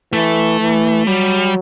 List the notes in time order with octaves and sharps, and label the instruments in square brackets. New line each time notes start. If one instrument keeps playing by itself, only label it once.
[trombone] E3 [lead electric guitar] A3
[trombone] E3
[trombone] F#3 [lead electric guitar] G3